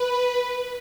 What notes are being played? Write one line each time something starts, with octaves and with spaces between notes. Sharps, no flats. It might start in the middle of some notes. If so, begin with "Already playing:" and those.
Already playing: B4